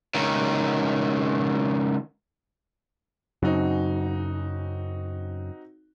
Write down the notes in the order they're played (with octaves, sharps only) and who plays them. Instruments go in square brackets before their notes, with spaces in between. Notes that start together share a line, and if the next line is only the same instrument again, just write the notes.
[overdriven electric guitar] C#2 D#3
[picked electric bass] F#2 C#3 F#3 [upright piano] C4 D#4 F#4